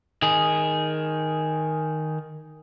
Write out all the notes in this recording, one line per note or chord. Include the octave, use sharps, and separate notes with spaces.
D#3 G#4